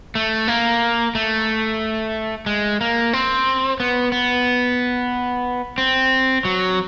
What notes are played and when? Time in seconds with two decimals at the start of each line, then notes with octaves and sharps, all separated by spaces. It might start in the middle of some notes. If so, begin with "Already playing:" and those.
0.15 A3
0.48 A#3
1.15 A3
2.46 G#3
2.81 A#3
3.13 C4
3.80 B3
4.12 B3
5.78 C4
6.45 F#3